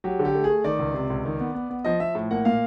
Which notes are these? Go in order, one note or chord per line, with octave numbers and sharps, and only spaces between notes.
F#3 G4
D3
G4
A3
G#4
A3
D#3 D5
C#2
C3
C#2
D#3
B3
B3
B3
F3 D#5
F3 E5
A2
A#3 F#5
A#2 F5